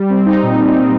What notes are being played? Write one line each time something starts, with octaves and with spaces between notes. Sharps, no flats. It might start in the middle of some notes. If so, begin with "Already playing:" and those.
Already playing: G3
C4
D#4
A#2
G3
C4